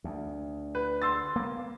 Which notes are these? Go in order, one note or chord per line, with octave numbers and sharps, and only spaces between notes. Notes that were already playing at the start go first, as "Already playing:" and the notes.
D2
B4
C6 E6 A6
A#3 B3